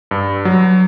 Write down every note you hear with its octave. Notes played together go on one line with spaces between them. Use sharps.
G2
F#3